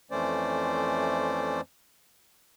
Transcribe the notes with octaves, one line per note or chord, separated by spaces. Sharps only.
F2 E3 A3 C#4 C5 D5